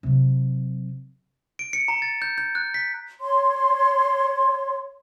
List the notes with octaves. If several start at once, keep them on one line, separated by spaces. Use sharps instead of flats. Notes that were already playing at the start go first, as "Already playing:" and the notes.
C3 F#3
D7
C#7
A#5
A6
G6
G6
F#6
B6
C#5 C6